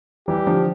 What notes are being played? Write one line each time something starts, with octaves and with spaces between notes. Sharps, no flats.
E3 G3 G4
D3 F3